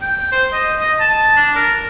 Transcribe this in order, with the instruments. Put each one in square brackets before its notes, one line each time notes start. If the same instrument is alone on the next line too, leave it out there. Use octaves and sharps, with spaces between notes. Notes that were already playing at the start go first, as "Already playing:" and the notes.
[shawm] G5
C5
D#5
D#5
A5
D4
A#4